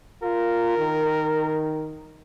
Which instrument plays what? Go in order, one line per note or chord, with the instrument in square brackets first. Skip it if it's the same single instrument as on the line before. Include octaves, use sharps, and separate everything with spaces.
[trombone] F4 [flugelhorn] A#4
[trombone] D#3